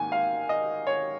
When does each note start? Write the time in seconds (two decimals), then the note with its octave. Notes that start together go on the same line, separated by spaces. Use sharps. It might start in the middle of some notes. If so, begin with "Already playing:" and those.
Already playing: G#2 D#3 A#3 G#5
0.12 F5
0.49 D#5
0.87 C#5